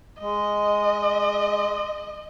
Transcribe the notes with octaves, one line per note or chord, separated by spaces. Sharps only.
G#3 D#5